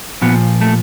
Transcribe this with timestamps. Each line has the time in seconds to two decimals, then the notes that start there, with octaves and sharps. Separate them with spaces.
0.22 A#2 F3 B3
0.61 A3